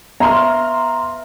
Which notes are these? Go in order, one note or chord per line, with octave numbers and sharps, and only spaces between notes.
B3 E5 A#5 C6 F6